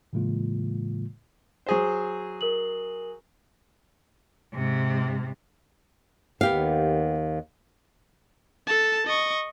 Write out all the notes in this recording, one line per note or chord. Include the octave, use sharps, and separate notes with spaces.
A2 C#3 E3 G#3 A#3 F4
F#3 G#4 C5
A#4 F#7
G#2 C3
D#2 B3 G4 F5
A4 A5
D#5 C#6